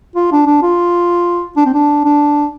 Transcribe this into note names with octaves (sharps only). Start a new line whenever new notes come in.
F4
D4
D4
F4
D4
C4
D4
D4